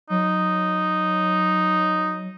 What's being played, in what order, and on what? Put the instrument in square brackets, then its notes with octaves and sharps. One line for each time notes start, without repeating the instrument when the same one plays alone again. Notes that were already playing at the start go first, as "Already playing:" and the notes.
[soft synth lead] F#3 [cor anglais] D#4